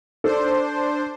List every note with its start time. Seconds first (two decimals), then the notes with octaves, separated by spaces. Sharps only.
0.24 D4 A4 C5